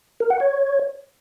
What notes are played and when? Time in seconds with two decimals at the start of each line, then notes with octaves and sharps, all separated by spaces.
0.20 A#4
0.30 F#5
0.40 C#5